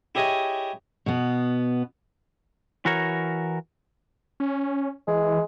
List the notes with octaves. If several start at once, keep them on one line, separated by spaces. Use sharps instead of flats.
E4 G4 G#4 C#5 D#5
B2 B3
E3 F#4 A#4 C#5
C#4
E3 G#3